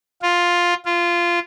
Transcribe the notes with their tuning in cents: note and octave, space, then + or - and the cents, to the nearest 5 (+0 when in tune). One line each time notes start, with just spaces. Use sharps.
F4 +5
F4 -15